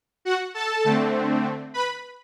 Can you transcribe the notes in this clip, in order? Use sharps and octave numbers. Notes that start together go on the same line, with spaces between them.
F#4 F#5
A4 A5
D3 A3 C4
B4 B5